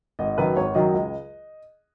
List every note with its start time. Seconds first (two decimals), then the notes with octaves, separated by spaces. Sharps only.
0.19 G#1 D#5
0.38 F#2 D#3 F#3 B4
0.56 G#1 C#5
0.75 F#2 D#3 F#3 D#5
0.94 C#2